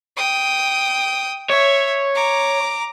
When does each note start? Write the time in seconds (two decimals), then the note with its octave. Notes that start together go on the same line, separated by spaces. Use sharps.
0.17 G5 D#6
1.50 C#5 E5
2.15 A#5 D6